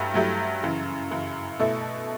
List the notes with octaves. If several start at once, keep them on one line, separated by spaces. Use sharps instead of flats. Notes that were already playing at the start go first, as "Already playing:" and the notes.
Already playing: G2 F#3 A3 E4 G4
G2 F#3 A3 E4 G4
F#2 C#3 E3
F#2 C#3 E3
B2 A3 E4 A4